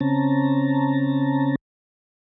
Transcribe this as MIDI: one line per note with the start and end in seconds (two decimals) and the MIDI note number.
0.01 1.56 49
0.01 1.56 60
0.01 1.56 61
0.01 1.56 81
0.01 1.56 82